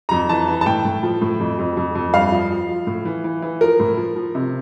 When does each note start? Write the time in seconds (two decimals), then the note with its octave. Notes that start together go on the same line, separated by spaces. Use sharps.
0.09 F2 A#5
0.29 E3 A5
0.48 E3
0.61 A5
0.66 A2 G5
0.85 A2
1.03 F3
1.21 A2
1.40 F2
1.59 F2
1.77 F2
1.95 F2
2.14 G2 F5
2.32 F3
2.50 F3
2.69 F3
2.87 A2
3.05 E3
3.24 E3
3.42 E3
3.61 F3 A#4
3.80 A2
3.97 F3
4.16 F3
4.35 C3